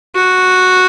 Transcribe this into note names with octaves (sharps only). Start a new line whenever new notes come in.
F#4